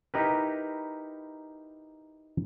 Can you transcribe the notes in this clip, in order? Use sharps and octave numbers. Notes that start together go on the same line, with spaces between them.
D#4 E4 G4 A#4 B4